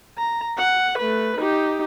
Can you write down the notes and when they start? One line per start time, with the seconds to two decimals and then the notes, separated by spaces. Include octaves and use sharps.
0.18 A#5
0.58 F#5
0.98 A3 B4
1.39 D#4 G4